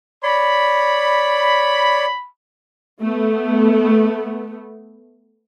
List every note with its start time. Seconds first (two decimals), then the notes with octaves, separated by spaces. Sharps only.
0.23 C#5 D5 B5
3.01 A3 B3